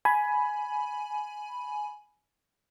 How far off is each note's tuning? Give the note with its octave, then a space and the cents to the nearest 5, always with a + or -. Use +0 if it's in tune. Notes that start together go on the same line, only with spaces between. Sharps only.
G#5 +15 B5 +0